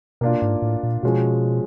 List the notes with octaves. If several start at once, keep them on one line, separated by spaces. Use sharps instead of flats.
B2 A#3 D4 F4
G#2
A2
A#2
B2 F3 G#3 C#4 F#4